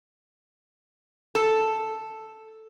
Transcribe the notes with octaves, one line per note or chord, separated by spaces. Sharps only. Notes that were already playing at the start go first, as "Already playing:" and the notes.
A4